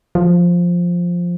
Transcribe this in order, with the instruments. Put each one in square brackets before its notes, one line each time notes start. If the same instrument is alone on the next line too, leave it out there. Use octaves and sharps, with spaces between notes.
[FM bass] F3